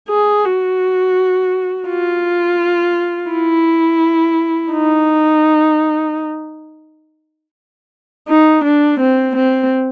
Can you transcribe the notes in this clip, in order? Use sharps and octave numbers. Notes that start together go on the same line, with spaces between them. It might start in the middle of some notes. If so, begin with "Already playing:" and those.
G#4
F#4
F4
E4
D#4
D#4
D4
C4
C4